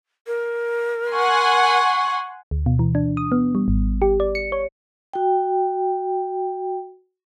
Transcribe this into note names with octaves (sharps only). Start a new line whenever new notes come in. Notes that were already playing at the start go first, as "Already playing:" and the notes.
A#4
F#5 G#5 C6 C#6
D2
B2
E3
D4
D#6
B3
G3
G#1
G4
D5
C#7
C#5
F#4 G5